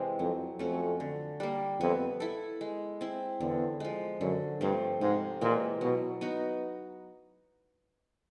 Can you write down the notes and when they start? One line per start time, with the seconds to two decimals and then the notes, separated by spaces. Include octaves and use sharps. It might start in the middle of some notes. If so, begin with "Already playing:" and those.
Already playing: C3 E3 G#3 C4
0.19 F2 F#3
0.59 F2 A3 C#4 F#4
1.00 D3
1.40 G3 A#3
1.80 F2 B3
2.20 E4 A4
2.61 G#3
3.01 C4 E4
3.40 E2 D3
3.80 F3 G#3
4.20 F#2 D3
4.60 G2 F3 A3 C4
5.01 G#2 C3
5.41 A#2 E3 G#3
5.81 B2 F#3
6.21 B3 D#4 F#4